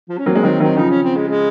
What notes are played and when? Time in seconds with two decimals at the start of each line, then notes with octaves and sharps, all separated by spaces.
0.09 F3
0.18 C#4
0.26 F#3 A#3 C4
0.35 G#3
0.43 D#3 F#3 C4
0.60 D#3 F#3 C4
0.77 C#3 F3 D#4
0.90 C#4
1.03 C4
1.16 G#3
1.28 G#3